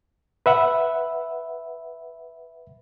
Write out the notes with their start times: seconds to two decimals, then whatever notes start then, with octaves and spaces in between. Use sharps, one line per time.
0.46 B4 E5 F#5